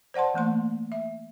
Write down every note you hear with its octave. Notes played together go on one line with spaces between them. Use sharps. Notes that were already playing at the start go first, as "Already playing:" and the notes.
C5 D5 F#5 A5 C6
E3 A3 A#3 C6
E5